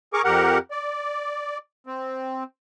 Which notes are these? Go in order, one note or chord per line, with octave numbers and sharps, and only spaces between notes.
G#4 A#4 C#6 D6
F2 G4 A#4 F#5
D5
C4